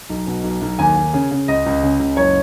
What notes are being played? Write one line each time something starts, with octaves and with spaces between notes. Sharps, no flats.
B1
B2
B1
B1
D#2 G#5
D#2
C#3
C#3
C#2 D#5
C#2
C#3
C#2
F#1 C#5